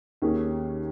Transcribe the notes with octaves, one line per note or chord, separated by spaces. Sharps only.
D#2 D#3 A#3 C#4 G#4